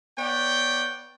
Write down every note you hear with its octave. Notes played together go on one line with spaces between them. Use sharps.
B3 C#5 D5 G5